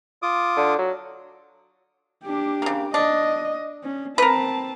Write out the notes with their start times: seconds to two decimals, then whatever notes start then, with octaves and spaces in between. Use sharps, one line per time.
0.22 F4 D6 D#6
0.57 D3
0.79 F#3
2.25 D4 G4
2.62 C#3 A#3
2.94 D4 D#5
3.83 C#4
4.18 C4 A#4 B4 A5